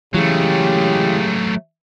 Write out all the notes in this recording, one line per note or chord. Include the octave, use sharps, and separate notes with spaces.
C#3 E3 F#3 G#3 A3 G4